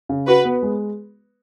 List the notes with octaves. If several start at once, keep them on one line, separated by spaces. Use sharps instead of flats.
C#3
F#4 B4
B3
G#3